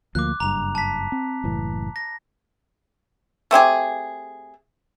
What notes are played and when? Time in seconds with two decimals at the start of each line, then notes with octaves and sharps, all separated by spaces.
0.15 D2 F3 A#3 D6 F#6
0.40 F#1 G2 A#5 F7
0.75 A5 B6
1.12 C4
1.44 F#1 A2 E3
1.96 A#6
3.51 A3 C4 G4 G#4